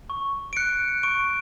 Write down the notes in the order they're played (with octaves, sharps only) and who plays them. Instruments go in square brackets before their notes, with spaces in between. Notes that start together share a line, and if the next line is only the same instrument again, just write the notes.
[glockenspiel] C#6
D7
F#6 C#7
C#6 D7